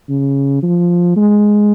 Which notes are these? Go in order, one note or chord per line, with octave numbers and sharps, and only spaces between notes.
C#3
F3
G#3